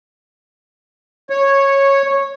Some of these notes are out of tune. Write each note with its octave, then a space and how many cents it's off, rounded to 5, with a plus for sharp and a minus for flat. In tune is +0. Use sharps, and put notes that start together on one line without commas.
C#5 -10